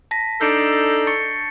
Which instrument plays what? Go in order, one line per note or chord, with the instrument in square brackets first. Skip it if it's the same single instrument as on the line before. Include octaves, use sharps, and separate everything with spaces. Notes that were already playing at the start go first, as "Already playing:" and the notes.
[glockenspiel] A5 A#6 B6
[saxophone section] D4 D#4 A4 [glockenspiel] G6 C7 D7
[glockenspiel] C#6 A6 C#7